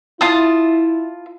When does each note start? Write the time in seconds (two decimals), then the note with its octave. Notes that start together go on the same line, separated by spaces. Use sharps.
0.21 E4 F4 A5 D#6